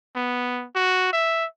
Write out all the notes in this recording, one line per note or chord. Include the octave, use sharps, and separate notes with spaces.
B3
F#4
E5